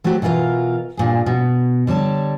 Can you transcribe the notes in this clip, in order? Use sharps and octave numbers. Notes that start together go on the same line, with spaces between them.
F#3 A3 C4 F#4 G4
B2 E3 F4 A#4 F5
G2 A#2 G#4
B2
D3 G3 C#5 A5